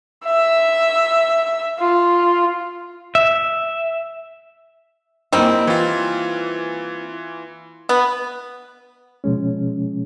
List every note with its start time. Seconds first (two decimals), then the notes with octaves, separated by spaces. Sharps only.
0.25 E5
1.79 F4
3.15 E5
5.33 D#3 G3 A#3 C4 E4 G#5
5.67 E3 F4
7.89 B3
9.24 B2 F3 G#3 C#4